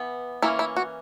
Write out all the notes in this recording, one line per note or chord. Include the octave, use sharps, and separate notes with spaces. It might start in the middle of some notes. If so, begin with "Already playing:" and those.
Already playing: E3 B3
E3 A#3 C#4 E4
E4
F#4